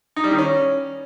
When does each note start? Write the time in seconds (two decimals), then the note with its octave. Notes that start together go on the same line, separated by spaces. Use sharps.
0.16 D#4
0.24 G3
0.31 D#3
0.38 C#4